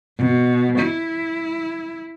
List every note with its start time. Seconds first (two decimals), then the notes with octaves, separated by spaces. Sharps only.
0.17 B2
0.79 E4